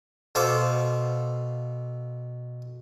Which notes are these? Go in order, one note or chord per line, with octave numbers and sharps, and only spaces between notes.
B2 A4 C5 F5 D6